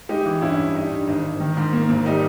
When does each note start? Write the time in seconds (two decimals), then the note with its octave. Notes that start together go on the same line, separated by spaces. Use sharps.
0.09 G#3 D#4 G4
0.25 E3
0.41 G2 C#4 E4
0.59 G2
0.75 G3 D#4
0.91 G2
1.07 G#1 D#4
1.24 G#1
1.40 D#3
1.57 G#2
1.73 A#3
1.89 G#1
2.05 G3 D#4